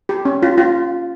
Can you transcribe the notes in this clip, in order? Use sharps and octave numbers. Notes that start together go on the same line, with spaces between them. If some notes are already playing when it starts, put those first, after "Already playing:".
G4
C#4
F4
F4